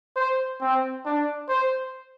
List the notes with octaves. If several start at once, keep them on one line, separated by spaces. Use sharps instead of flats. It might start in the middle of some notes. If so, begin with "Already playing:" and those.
C5
C4
D4
C5